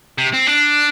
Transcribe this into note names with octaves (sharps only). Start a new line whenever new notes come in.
C3
C4
D4